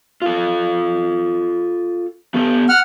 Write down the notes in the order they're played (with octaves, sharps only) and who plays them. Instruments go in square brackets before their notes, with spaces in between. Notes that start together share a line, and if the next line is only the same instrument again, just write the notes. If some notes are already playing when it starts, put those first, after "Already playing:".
[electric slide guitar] F4 A4
B3 G4 A4
[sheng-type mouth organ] F#5 F6